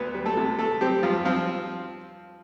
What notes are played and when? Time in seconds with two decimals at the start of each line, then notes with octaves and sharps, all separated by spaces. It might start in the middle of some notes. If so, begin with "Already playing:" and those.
Already playing: D2 B3 B4
0.14 G3
0.26 A3 A4
0.37 C3
0.58 A3 A4
0.81 G3 C4 G4
1.03 G2 F3 F4
1.25 F3 C4 F4